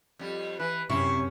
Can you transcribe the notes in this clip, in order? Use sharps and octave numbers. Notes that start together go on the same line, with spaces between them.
F2 G3
E3 B4
F#2 C3 C#4 E4 C#6